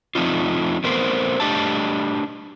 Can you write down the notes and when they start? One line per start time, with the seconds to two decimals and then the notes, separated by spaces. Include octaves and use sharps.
0.15 F3 A3 C4 D4 D#4 F4
0.84 A3 B3 C4 A#4 C5
1.40 A3 D4 G4 D#5 A5